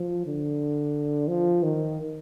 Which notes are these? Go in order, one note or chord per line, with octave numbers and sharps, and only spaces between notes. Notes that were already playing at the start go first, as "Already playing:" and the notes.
Already playing: F3
D3
F3
D#3